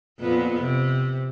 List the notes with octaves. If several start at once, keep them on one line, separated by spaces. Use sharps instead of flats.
F2 A#2 B3
C3